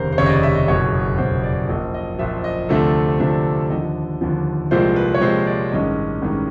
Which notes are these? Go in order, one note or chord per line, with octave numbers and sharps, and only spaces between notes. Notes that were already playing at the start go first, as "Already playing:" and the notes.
Already playing: F1 D#2 C#3 A#4 C5
C5
F1 D#2 C#3 C#5
D#5
D5
E5
D#5
F#1 E2 B2 C#5
F#1 E2 B2 C5
D5
A#1 A#2 F3 D#5
D#5
A#1 A#2 F3 E5
D#5
D2 C3 F3 A3 D4 A4
D2 C3 F3 A3 D4
D#2 D3 F3 D#5
D#2 D3 F3
C2 A#2 F3 G#3 C4 C5
B4
C#5
C2 A#2 F3 G#3 C4 C5
D5
A1 G2 D#3 G#3 C#4 D#5
A1 G2 D#3 G#3 C#4